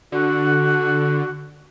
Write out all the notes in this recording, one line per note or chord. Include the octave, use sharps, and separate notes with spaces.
D3 F#4